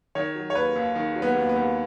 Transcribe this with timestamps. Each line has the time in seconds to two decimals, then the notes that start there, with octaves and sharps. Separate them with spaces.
0.15 D#3 C#5
0.35 F#3
0.50 C#5
0.55 D#2 B4
0.75 D#2
0.95 D#3
1.15 F#3
1.22 B3
1.36 D#2
1.49 B3
1.56 D#2